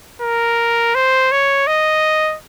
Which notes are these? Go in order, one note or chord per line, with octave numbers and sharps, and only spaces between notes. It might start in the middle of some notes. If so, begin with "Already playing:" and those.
A#4
C5
C#5
D#5